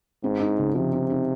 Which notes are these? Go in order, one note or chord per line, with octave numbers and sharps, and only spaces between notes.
G#2 C4
D#4
C#3
C3 F3
C4
D#4